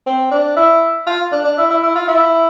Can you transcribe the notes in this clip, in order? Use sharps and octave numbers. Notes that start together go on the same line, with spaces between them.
C4
D4
E4
F4
D4
D4
E4
E4
E4
F4
E4